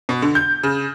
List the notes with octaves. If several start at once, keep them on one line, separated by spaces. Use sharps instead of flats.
B2
D3
G6
C#3